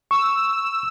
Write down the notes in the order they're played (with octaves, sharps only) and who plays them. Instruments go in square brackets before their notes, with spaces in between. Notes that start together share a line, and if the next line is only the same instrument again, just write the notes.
[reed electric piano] C#6 [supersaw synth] E6